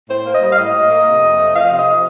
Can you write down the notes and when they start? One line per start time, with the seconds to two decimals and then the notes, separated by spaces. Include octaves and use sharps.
0.08 A2 C5
0.25 A#3
0.33 D#5
0.41 G3
0.52 F5
0.57 A2 D#5
0.74 A2
0.89 A#3
1.06 C3
1.21 F2
1.37 A3
1.55 F3 F5
1.71 C3
1.78 D#5